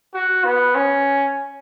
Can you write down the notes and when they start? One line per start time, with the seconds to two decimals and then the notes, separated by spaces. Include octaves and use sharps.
0.14 F#4
0.44 B3
0.75 C#4